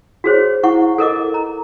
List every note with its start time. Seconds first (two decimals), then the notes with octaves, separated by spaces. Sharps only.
0.24 F#4 G#4 C5 C#5
0.63 E4 F#5 C#6
0.98 A4 A#4 D#5 D6
1.34 A#5